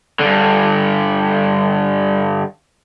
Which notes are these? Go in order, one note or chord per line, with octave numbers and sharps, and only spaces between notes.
G2 D3